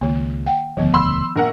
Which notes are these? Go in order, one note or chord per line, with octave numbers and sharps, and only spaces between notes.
C#2 D#3 A#3
F#5 G5
E1 D2 D#3 F3 B3
B5 C6 E6
A#1 A#4 F#5